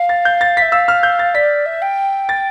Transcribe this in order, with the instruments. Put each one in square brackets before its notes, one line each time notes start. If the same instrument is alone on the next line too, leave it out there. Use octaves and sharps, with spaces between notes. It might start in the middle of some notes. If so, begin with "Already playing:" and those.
Already playing: [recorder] F5
[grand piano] A6
G6
A6
B6
[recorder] E5
[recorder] F5 [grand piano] E6
[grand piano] F6
G6
A6
[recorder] D5 [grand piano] B6
[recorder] E5
G5
[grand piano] A6